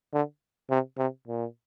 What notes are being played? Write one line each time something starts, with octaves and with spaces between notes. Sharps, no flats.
D3
C3
C3
A#2